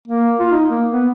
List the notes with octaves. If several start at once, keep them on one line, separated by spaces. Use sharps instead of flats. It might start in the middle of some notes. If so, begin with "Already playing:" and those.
A#3
F4
D#4
A#3
B3